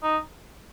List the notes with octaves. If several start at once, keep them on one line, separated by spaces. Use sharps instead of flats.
D#4